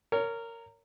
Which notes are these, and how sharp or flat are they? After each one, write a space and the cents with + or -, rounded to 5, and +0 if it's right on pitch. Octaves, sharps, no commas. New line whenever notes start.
A#4 -15 C#5 +20